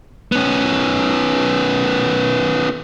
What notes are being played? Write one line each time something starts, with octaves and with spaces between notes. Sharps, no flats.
B3 C#4